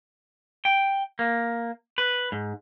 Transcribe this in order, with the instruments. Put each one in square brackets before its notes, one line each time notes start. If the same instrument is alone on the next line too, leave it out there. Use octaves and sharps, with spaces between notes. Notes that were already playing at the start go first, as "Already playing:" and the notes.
[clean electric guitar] G5
A#3
B4
G#2